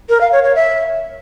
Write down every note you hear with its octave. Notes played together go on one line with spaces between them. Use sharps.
A#4
F5
C#5
C#5
E5